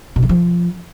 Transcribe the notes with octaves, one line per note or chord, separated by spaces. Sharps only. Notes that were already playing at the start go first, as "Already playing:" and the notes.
B2
E3
F3